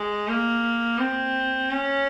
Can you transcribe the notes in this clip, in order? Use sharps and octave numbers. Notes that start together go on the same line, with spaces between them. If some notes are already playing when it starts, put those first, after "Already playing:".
Already playing: G#3
A#3
C4
C#4